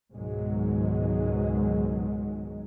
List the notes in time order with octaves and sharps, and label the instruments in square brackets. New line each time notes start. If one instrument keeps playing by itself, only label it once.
[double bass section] C#2 G#2 B2 D#3 F#3 G#3